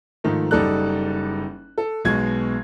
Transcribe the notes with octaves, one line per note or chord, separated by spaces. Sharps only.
G#2 D#3 F3 A3
F#1 G3 D#4 A4 D5 F#6
A4
B1 B2 G#3 F#4 G#6